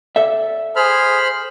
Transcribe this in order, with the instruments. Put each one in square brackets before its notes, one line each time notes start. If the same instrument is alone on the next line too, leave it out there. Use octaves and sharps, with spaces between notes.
[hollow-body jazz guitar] A4 D5 E5
[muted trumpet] G#4 [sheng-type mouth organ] C5 B5 F6